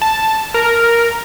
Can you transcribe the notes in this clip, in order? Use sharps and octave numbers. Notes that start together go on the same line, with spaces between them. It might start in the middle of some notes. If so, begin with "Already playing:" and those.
A5
A#4